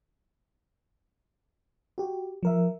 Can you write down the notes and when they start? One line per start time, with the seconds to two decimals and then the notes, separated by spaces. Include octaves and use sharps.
1.98 F#4 G4
2.43 F3 A#4 E5